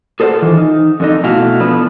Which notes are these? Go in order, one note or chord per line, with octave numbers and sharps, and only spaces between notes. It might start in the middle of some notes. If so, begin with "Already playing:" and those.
G#4 A4 C5 D5 F#5
D#3 E3 F4
D#4
F2 D3 D#4
B2 A3 E4 F#4 F5
F3 B3 D4 B4